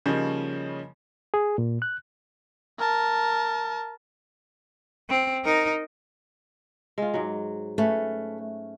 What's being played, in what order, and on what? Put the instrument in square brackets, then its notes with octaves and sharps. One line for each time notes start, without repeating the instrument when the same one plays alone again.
[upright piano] C#3 F3 G3 A#3 C#4 D#4
[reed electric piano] G#4
A#2
F#6
[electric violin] A#4 A5
[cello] C4
D#4 A#4
[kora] G#3 F4
G#2 F#3
[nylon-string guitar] A3 [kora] C#4 B4